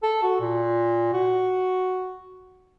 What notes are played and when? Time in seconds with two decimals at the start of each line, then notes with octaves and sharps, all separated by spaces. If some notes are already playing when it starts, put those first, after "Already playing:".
0.03 A4
0.22 F#4
0.40 A#2
1.13 F#4